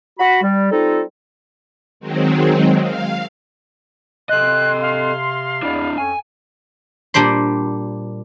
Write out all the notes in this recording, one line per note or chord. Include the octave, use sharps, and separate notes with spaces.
F#4 B5
G3
G3 C4 D#4 F4 A4
D#3 F#3 G#3 C4
F5
C3 A4 D#5 C6 F#6
F5
E2 D4 E4 D5 B5
F2 C4 C#4 G#5
A#2 G3 D4 C5 C6